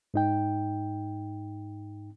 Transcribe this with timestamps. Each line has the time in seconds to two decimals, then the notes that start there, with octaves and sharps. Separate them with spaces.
0.14 G#2 D#4 G5